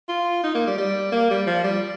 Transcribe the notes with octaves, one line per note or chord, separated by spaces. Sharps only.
F4
D#4
A#3
G3
G3
A#3
G3
F3
G3